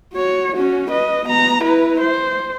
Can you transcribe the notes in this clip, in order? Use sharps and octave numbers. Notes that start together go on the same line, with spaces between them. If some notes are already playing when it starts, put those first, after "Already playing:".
F#4 C#5
C#4 F#4
B4 D#5
B3 A#5
E4 B4
C5